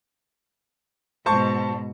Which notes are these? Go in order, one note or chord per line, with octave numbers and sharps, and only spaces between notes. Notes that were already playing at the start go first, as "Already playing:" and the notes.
G#2 B2 C5 A5 C#6